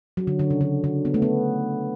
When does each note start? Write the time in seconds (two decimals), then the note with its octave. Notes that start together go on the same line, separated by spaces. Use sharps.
0.17 F#3
0.27 D3
0.39 D3
0.50 C#3
0.61 D3
0.84 D3
1.05 B3
1.14 A3
1.22 B3